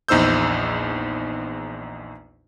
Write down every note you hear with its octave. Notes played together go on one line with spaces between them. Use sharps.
A#1 E2 D#4 C5 E6 G6